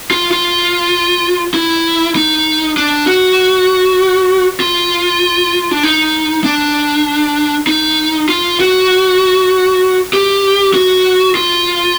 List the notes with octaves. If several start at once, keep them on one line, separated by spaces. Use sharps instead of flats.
F4
F4
E4
D#4
D4
F#4
F4
D4
D#4
D4
D#4
F4
F#4
G4
F#4
F4